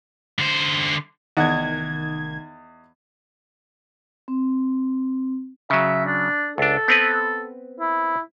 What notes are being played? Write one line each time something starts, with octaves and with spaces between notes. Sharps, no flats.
D3 C5
F1 E2 D#3 D#4 F#5 G#6
C4
C#3 F#3 E5
D4
C#2 D4 A4
B3 C4 B4
E4